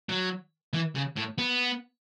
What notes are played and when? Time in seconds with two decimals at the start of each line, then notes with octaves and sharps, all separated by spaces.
0.09 F#3
0.73 E3
0.95 C#3
1.16 A2
1.38 B3